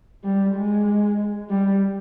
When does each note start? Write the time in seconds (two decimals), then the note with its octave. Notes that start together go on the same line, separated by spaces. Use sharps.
0.24 G3
0.55 G#3
1.50 G3